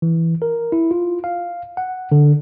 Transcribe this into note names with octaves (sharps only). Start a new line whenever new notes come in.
E3
A#4
E4
F4
F5
F#5
D3